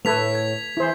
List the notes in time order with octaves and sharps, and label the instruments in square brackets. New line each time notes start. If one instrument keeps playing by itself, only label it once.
[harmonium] A2 [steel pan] A3 A4 B4 [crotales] G#6 B6 F7
[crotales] G#6
[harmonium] E3 G#4 [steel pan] E4 C5